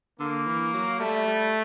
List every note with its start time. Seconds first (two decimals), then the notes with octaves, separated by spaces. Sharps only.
0.20 D3 A#3
0.47 E3
0.74 F#3
1.00 G3 A3
1.27 G3